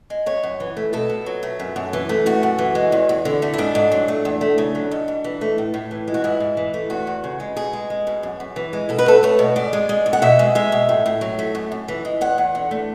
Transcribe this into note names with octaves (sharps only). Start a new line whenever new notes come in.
G#3
F#2 C#5
F#2
E3
A3
B2 A4
B2
F#3
A3
F#2
F#2
E3
A3
F#2 F#4
F#2
E3
G#3
E2
E2
D3
A3
E4
G#2 D4
G#2
F#3
A3
E2
A3
C#3
F#3
G#2
G#2
E3
A3
A2
A2
E3
G#3
F#4
G#2 E4
G#2
E3
A3
E2 F#4
E2
C#3
G#3
B2 G#4
G#3
G#3
B2
F#2
F#2
E3
G#3
B2 A4
B4
A3 A4
A3 C#5
B2
G#2 D5
G#3
G#3
G#2
F#5
B2 E5
G#3
G#3 E5
B2
A2
A2
F#3
A3
F#2
F#2
E3
G#3
E2 F#5
E2
D3
A3